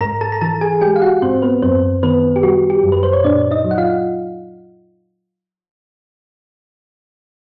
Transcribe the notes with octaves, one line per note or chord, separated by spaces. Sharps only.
G#2 A#4 A#5
A4 A5
A#5
E3 A4 A5
G#4 G#5
G#3 G4 G5
F5
F#4 F#5
G#2 C4 C5
B3 B4
F#2 C4 C5
D#3 B3 B4
G4
G3 F#4
G4
F#2
B4
C5
C#5
A#2 D4 D5
D#4 D#5
F#3
F#5
F4 F5